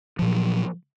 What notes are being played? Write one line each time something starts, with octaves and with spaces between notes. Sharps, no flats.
A#2 F3 F#3